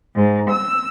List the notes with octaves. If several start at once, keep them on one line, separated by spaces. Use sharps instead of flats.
G#2
E6